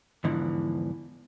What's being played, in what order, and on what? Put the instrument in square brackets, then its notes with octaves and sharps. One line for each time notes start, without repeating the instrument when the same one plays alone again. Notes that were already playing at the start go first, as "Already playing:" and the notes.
[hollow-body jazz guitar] E2 G#2 D3 E3 F3